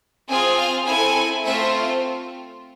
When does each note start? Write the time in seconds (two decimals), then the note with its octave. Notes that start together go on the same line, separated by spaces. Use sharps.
0.29 C4 F4 G#4 G#5
0.57 F5
0.86 C4 E4 A4 G#5
1.44 A3 C4 F4 E5